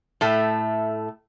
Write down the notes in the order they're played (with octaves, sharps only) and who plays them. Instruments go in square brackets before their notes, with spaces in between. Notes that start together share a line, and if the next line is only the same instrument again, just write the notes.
[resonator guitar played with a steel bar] A2 A3